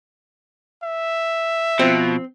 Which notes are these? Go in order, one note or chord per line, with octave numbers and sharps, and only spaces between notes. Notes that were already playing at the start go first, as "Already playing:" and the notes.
E5
B2 F3 C4